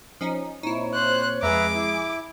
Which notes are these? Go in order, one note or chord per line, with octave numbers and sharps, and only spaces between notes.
F3 C#4 D#4
A#2 C4 D#4 E4 C#5
C5 F#6
F2 G#3 G#4 B4 E5 A#5 D6
E4